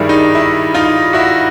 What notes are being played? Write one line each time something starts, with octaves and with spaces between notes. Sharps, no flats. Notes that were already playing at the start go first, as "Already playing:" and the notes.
Already playing: G2 D#3 G3 E4 G#4 A#4
D#4
E4
D#4 F4
E4 F#4